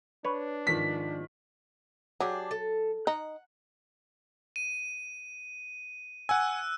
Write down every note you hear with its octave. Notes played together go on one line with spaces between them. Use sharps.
D4 B4 C#5
G#2 D#3 F3 B6
F#3 D4 G4 G#4
A4
D#4 F#5
D#7
F#5 G#5 E6 F#6